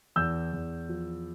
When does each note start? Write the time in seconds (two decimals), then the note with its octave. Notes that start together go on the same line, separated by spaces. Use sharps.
0.16 E2 E6 G6
0.53 E2
0.89 F3